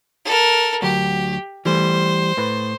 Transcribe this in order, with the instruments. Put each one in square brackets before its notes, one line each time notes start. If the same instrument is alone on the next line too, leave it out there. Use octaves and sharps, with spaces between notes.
[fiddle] A4 A#4
[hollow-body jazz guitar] D2 F#3 [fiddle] G4
[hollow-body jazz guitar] E3 G3 A3 [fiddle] C5
[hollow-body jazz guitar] A2 B4 C6